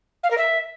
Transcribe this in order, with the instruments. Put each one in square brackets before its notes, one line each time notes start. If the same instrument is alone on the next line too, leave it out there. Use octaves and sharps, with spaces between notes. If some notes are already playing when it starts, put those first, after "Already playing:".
[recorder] F5
A#4
E5